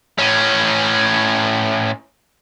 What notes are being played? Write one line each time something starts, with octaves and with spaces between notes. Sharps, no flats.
A2 C#4